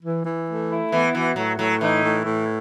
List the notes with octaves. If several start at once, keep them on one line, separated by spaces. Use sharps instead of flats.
E3
E3
A3
E4
E3 B3
E3 F#4
A2 F#3
A2 F#3
E3 D#4
A2
A2